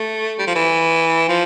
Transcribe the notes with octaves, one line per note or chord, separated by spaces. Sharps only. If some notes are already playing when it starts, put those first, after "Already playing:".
Already playing: A3
G3
F3
E3
F3